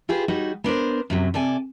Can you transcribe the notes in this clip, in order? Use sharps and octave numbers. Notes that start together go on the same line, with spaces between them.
F4 G4 G#4 B4 C5
G3 D#4 F#4 C#5
B3 D4 A#4 C5
F#2 C3 F#3
C3 A4 D5 G#5